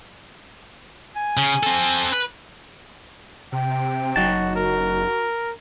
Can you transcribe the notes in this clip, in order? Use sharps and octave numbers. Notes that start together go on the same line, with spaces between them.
G#5
C#3
C4 A4
B4
C3 G5
F#1 F#3 D#4 F#4 A5
F#4 A#4